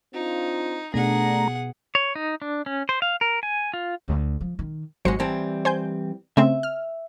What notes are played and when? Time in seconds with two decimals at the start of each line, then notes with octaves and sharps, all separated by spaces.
0.14 C4 D4 D#4 F4
0.94 B2 A3 B3 D4 G#4 F#5 A#5
1.95 C#5
2.15 D#4
2.42 D4
2.66 C#4
2.89 C5
3.02 F5
3.21 A#4
3.43 G#5
3.74 F4
4.08 D2
4.41 F3
4.59 D#3
5.05 G#1 F#3 G#3 C5 C#7
5.20 E3 G3 C4 A5
5.65 C5 G#5 G6
6.37 C#3 A3 C4 E5
6.63 F6